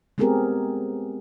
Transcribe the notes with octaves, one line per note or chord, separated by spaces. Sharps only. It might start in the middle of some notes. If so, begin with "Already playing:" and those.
G#3 B3 C4 G4 G#4 A#4